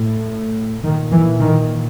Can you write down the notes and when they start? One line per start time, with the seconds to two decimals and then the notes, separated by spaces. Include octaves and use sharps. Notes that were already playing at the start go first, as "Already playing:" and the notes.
Already playing: A2
0.83 A#2 D#3
1.11 E3
1.40 D#3